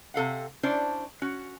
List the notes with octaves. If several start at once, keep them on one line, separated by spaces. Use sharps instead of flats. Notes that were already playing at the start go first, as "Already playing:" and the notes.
C3 A4 F5 F#5
C#4 D4 E4 C5 D5
C#4 F#4